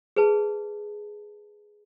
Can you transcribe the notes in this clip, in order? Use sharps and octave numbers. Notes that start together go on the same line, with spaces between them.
G#4 B4 A5